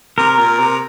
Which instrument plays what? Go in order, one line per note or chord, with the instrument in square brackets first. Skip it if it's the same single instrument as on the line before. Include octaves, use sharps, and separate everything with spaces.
[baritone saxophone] C3 [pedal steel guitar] A#4
[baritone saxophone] A#2
C3